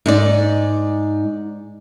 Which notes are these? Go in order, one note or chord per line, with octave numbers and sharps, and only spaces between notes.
G#2 D#4 D5